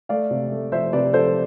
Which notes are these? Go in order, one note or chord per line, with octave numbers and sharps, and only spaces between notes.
A3 D5 F5
C3
A3
F3 C5 E5
C3 B4 D5
F3 A4 C5